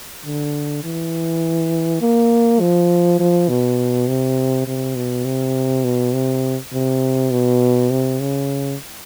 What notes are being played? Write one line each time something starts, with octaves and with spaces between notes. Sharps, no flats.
D3
E3
A#3
F3
F3
B2
C3
C3
B2
C3
B2
C3
C3
B2
C3
C#3